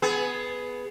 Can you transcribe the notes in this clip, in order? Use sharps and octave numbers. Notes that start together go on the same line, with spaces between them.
B3 G#4